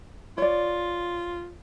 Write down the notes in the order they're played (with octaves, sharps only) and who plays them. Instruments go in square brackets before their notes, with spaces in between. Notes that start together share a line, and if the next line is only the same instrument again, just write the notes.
[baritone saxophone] F4 [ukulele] C#5 D5